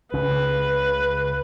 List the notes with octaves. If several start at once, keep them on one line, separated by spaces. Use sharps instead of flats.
C#2 C#3 B4